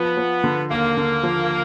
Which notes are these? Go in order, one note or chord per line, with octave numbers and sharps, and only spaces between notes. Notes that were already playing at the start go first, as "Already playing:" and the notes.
Already playing: F3 B3
F3
D3
D#2 A#3
D3
F3